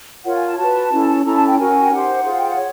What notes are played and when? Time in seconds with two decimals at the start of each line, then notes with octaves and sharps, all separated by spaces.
0.25 F4 A#4 C#5 F#5
0.35 G#5
0.47 A5
0.58 F#4 B4 A5
0.91 C#4 E4 A4
1.24 C#4 E4 A4 A#5
1.35 A5
1.47 G5
1.57 C#4 F#4 A#4 G#5
1.82 G5
1.90 D#4 G4 C5 F#5
2.23 F4 G#4 C5
2.37 G5
2.47 F#5
2.57 C#5